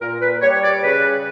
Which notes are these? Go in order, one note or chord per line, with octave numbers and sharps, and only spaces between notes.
A#2 A#4
B4
G3 C#5
D5
C#3 B4